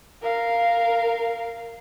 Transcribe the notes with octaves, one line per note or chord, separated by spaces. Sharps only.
A#4 F5